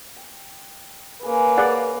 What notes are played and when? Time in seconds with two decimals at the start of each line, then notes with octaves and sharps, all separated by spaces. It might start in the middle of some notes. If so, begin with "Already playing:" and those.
0.16 G5
1.23 A#3 C#4 G#4 B4
1.58 G#4 D5 F#5 G#5